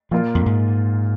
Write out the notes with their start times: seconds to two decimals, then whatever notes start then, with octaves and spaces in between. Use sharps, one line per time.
0.11 A#2 F3 A#3 F4
0.35 F2
0.46 G#2